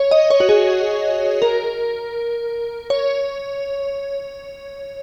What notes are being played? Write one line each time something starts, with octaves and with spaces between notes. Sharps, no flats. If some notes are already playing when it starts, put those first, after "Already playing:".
Already playing: C#5
D#5
C#5
F#4
G#4
A#4
C#5